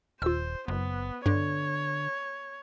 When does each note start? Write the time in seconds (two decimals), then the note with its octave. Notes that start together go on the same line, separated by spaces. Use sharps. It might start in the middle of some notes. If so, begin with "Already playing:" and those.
0.22 D#1 F4 C5 E6
0.68 F#1 B3
1.26 G2 D3 C#5